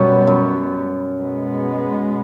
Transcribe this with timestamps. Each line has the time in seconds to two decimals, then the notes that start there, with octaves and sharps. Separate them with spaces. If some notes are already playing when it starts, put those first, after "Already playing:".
Already playing: F#2 B2 G3 B3
0.27 F#2
1.15 B2 G#3 B3